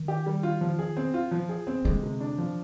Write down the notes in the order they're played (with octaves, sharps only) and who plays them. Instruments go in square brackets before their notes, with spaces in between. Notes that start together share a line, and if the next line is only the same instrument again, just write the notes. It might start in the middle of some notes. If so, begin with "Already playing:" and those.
Already playing: [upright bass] D#3
[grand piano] G4
G3
F4
F3
G#4
C4
F4
F3
G#4
C4
[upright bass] D3 [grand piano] G#3
[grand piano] C3
D4
F3